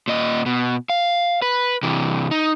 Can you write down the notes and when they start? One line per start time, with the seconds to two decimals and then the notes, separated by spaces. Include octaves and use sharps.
0.08 A#2 D#5
0.46 B2
0.90 F5
1.42 B4
1.83 C3 E3
2.31 D#4